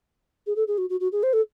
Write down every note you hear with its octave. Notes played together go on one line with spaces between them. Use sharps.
G#4
A4
G#4
F#4
F#4
F#4
G#4
C5
A4